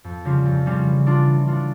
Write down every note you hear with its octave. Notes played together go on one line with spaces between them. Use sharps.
F2
C#3 G3 C#4 F4
F2
C#3 G3 C#4 F4
E3
A3 D4 F4
E3
A3 D4 F4